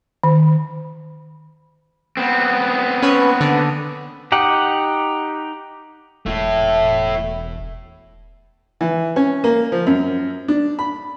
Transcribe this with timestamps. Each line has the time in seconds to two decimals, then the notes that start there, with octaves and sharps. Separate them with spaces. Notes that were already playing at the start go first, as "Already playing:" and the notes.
0.24 D#3
2.17 B3 C4
3.03 C#4 B4 C#5
3.41 D3
4.32 D#4 G4 F#5
6.26 E1 A3 E4
8.81 E3
9.16 C#4
9.44 A#3
9.72 F3
9.87 F#2
10.48 D4
10.79 B5